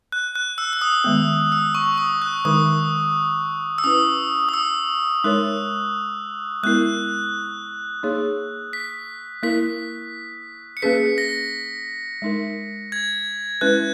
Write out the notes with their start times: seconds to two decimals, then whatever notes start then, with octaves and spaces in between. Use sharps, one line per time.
0.12 F#6
0.36 F#6
0.58 E6
0.73 E6
0.81 D#6
1.04 D#3 G#3 B3
1.52 E6
1.75 C#6
1.98 D#6
2.22 F#6
2.45 D#3 G#3 D#4 A#4 D#6
3.78 E6
3.84 C#4 E4 B4 D#6
4.49 D#6
4.54 E6
5.24 G#3 D#4 A#4 C#5 F#6
6.63 G#3 B3 E4 A#4 F#6
8.03 A#3 D#4 G#4 C#5
8.73 B6
9.43 A#3 E4 A#4 B6
10.77 C#7
10.82 A#3 C#4 G#4 B4 B6
11.18 A#6
12.22 G#3 D#4 A#4
12.92 G#6
13.61 G#3 C#4 E4 B4 F#6